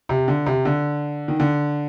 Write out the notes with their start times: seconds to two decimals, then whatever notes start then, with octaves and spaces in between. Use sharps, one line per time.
0.09 C3
0.28 D3
0.46 C3
0.65 D3
1.28 D#3
1.40 D3